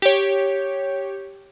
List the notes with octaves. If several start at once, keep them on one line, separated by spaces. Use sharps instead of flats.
G4 C#5